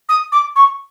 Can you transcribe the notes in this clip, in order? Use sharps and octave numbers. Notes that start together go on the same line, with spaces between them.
D#6
D6
C#6